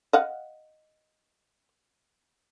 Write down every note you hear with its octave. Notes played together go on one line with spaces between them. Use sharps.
D#5 F5 F#5